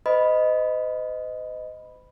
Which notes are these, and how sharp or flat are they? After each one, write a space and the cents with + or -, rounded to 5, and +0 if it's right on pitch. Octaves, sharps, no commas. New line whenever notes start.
C5 -45 D#5 +0 B5 +0